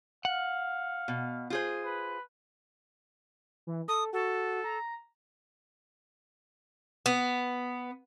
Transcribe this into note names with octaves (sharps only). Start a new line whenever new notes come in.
F5 F#5
B2
F4 G#4 C5
B4
E3
A4 D#6
F#4 A4
A#5
B3